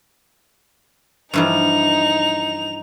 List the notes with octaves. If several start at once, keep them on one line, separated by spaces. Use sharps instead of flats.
G2 E3 F3 D#4 F7